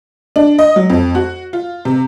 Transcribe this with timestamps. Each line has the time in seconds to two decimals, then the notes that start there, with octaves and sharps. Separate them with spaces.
0.36 D4
0.59 D#5
0.76 F#3
0.90 F2
1.15 F#4
1.53 F4
1.85 C3